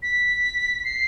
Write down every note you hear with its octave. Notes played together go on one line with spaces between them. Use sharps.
B6
C7